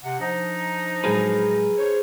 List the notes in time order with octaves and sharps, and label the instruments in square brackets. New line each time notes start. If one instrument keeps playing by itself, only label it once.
[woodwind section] C3 F#5
F3 D4 D#4
[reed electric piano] A2 F#3 G#3 [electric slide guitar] G#4 A#4 B4
[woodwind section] D4 C5 C#5